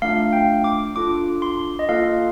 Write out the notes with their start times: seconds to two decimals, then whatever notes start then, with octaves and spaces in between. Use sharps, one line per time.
0.02 A3 D4 F4 F5
0.33 G5
0.64 D6
0.95 D4 F4 A4 D6
1.42 C6
1.79 D#5
1.89 A#3 F4 A4 F5